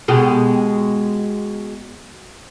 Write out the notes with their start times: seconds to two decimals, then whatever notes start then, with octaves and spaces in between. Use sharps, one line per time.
0.08 B2 G#3 G4